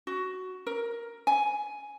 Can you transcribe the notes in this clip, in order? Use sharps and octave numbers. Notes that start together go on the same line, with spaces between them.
F#4
A#4
G#5